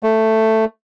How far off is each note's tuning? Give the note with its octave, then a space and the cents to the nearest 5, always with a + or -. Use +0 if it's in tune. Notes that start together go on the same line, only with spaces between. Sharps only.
A3 +5